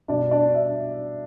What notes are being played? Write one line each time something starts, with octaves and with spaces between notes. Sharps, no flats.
B2 G3 D4 D5
D4 D5
E5